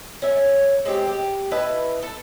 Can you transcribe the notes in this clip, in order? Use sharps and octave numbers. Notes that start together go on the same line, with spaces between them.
C#4 E5
G#3 C4 G4 A4
G4
E4 B4 D#5 A5
A4